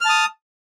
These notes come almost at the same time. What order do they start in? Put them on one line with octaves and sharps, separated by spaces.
F6 A5 D#6